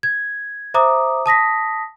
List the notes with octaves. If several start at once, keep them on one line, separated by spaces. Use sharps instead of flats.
G#6
C5 E5 A#5 D6 D#6
A5 D#6 A#6 B6